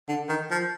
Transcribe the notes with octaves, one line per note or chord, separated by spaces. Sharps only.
D3
D#3
F3